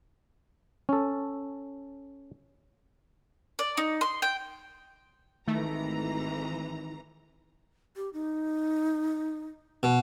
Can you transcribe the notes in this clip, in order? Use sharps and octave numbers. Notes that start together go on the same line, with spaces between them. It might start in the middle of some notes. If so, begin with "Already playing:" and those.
C#4 A4
D5
D#4
C6
G5
G#1 D#3 E3 A3 A#5
G4
D#4
B2